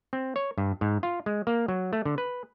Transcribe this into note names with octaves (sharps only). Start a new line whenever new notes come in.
C4
C#5
G2
G#2
F4
G#3
A#3
F#3
A3
D3
B4